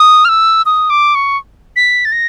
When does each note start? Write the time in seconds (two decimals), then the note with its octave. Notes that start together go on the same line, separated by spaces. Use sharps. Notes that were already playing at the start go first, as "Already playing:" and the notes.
Already playing: D#6
0.25 F6
0.29 E6
0.66 D#6
0.90 D6
1.15 C#6
1.76 B6
2.05 A6
2.12 A#6